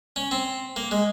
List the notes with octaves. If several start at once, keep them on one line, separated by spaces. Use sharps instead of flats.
C#4
C4
A#3
G#3